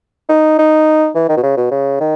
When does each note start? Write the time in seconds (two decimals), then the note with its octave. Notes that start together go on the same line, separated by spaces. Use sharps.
0.29 D#4
0.59 D#4
1.15 E3
1.29 D#3
1.37 B2
1.43 C#3
1.57 B2
1.71 C#3
2.00 D#3